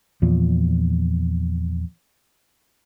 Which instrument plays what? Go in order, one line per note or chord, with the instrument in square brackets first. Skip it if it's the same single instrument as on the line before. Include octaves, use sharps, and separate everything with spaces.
[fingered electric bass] E2 A#2 F3